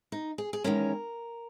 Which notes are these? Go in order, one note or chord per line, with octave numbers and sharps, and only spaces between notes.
D#4
G#4
G#4
E2 D#3 G#3 C#4 A#4